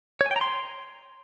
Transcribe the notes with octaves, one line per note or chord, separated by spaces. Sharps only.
C#5
G#5
G5
A#5
C6